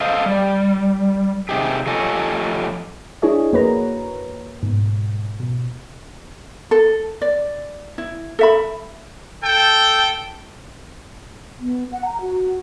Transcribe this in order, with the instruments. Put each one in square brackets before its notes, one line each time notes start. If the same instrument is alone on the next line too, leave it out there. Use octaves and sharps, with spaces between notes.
[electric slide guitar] A4 C5 D#5 F5
G3
C3 D#4 G4 G#4
F3 G4 A4 C#5 D#5 G#5
[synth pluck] D4 E4 G#4 C#5 D#5
F2 A#3 F#4 B4 C#5 A#5
G#2 B2
B2
[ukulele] A4
D5
E4
A4 E5 B5
[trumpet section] A4 G5
[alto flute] B3
F#5
A#5
F#4